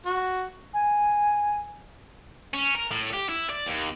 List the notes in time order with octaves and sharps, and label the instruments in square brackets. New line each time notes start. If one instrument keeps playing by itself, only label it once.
[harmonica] F#4
[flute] G#5
[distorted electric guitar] C#4
A#4
A2
G4
E4
D5
D#2